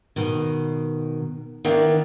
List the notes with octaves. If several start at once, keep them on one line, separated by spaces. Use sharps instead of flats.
B2 D#3
D#3 B3 D4 E4 F5